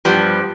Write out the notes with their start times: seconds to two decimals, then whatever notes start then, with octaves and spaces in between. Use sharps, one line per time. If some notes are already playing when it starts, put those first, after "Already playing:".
0.05 G2 F3 G3 B3